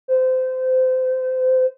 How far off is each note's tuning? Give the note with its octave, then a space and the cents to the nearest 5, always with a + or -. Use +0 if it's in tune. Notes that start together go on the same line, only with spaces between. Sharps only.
C5 -25